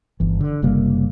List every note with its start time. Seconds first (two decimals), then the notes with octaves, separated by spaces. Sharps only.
0.20 G1 E3
0.41 D3
0.62 F#1 C3 G3 A#3